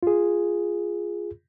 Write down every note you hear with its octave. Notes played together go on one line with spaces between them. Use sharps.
F4 G#4